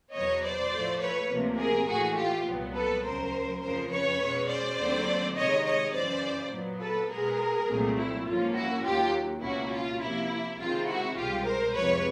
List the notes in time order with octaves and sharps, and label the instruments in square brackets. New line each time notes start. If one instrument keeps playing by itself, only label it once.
[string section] E2 B2 F#3 B3 C#5 D#5
C5 D5
A2 F3 A3
B4 C#5
D2 C3 F3 A#3
G#4 A#4
A2 E3 A3 F#4 G#4
F4 G4
C2 A#2 F#3 B3
A4 B4
D2 C#3 F#3 A#4 C5
F2 C#3 F3 A#4 C5
B4 C#5
B2 G#3 C#4
C5 D5
D#2 D3 F#3 A3 C4
C3 D#3 G#3 C#5 D#5
C#5 D#5
F#2 C#3 E3 C5 D5
A#2 F#3 B3
A4 B4
B2 G#3 B3 G#4 A#4
C2 A#2 F#3 A3 C4
E4
G#2 F3 A#3 C#4 F4
E4 F#4
D#2 D#3 F#3 F4 G4
C#2 B2 F#3 A#3 C#4 E4 F#4
F4
C3 F3 A#3 E4
C#2 C3 D#3 G#3 C4 F4
E4 F#4
C2 B2 G#3 F4 G4
A#4 C5
F2 C3 F3 G#3 B4 C#5